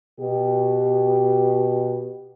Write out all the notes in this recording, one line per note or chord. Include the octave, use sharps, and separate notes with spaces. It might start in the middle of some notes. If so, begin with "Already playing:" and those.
B2 G4